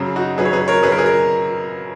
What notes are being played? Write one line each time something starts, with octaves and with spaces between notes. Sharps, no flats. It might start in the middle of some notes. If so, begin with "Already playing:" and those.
Already playing: F#2 C#3 F#3
D#4 F#4
F#2 C#3 F#3 G#4 B4
C#5
G#4 B4
A#4 C#5
F#2 C#3 F#3 G#4 B4
A#4
G#4 B4
A#4